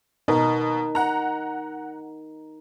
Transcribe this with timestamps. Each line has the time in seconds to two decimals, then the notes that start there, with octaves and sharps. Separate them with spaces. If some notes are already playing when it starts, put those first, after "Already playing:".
0.28 B2 D#4 A#4
0.95 F#5 A#5